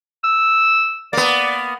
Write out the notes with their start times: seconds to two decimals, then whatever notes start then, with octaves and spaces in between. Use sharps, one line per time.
0.24 E6
1.13 A#3 B3 D5